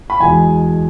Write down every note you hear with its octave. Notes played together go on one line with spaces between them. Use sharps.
B5
E2 B2 G#3 G#5